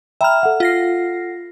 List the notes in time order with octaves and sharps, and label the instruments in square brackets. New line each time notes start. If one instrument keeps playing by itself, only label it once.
[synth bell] E5 F6 [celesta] G5 A#5 B5
[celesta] A4 F#5
[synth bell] F4 A#6 C7